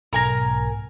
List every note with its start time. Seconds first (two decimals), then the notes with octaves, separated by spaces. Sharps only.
0.13 B1 G#2 A#4 G#5 A#5